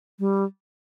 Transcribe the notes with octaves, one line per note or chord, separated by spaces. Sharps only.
G3